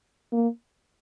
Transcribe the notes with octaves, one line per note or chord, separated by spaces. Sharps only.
A#3